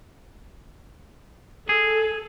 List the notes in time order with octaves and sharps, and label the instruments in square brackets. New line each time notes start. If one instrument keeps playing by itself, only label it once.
[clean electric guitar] G#4 [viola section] A4